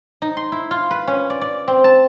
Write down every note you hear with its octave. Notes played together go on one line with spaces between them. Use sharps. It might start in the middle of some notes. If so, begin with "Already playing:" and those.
D#4
C6
E4
F4
B4
C#4
D5
D5
C4
A5